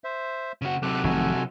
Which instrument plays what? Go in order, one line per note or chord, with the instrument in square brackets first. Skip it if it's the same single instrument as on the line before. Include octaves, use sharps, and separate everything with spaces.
[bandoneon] C5 E5
[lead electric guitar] C#3 F#4
[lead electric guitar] C3 F#3 [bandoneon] A4 D6 F#6
[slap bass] F1 D#3 [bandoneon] F#4 A4 G#5